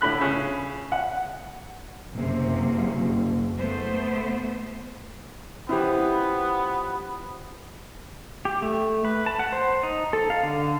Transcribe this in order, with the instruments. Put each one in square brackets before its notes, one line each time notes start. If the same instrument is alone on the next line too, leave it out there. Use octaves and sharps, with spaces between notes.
[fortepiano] A2 D3 B5 F#6
C#3
F#5
[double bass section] F#1 [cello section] C3 A#3
[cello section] A3 B3 C5
[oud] E3 F3 C#4 [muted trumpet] B3 [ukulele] E4 G4
[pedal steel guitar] G4
A3
B4
A5
F#5
C5
D#4
A4
F5
D3